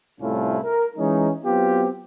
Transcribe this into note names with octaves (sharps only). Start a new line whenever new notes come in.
C2 A2 A3 C#4 E4 F4
A#4
E3 G#3 C#4 D#4
F#3 B3 C4 F4 G4